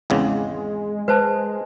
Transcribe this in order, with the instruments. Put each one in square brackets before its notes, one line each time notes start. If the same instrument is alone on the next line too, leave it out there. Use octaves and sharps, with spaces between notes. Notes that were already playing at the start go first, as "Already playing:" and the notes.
[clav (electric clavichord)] G#1 E2 C#3 [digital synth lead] G#3
[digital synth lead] G#3 [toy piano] B4 C5 A5